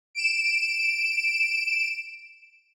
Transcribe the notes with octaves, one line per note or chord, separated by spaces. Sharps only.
D7 E7